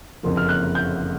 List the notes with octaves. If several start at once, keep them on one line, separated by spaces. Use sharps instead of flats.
F#1 F2 D3 F3 A#3
F6
F#6
G6